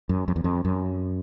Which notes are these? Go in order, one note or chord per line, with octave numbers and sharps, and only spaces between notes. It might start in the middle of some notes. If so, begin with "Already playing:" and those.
F#2
F2
E2
F2
F#2